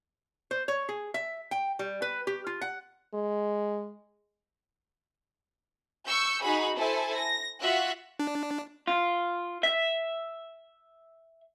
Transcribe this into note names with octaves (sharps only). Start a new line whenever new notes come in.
C5
C#5
G#4
E5
G5
G3
B4
G4
F4
F#5
G#3
C#6 E6 G6 C#7
D#4 F#4 G#4 B5
E4 A4 C5 G#5 A5
A#6
F4 F#4 E5 F#6
D4
F4
E5